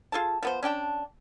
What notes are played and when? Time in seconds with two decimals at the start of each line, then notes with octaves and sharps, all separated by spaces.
0.12 F4 G#4 A4 A5
0.43 F3 B3 C5
0.63 C#4 D4 G5 A5